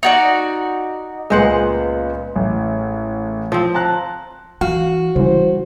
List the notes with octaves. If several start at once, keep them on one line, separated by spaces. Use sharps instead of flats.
D#4 F#4 D5
C#2 A#2 G#3 B3 C5 F#5
A1
F3 C4
A5 A#5 F#6
E3 F#4 F5
C#3 E3 G3 C5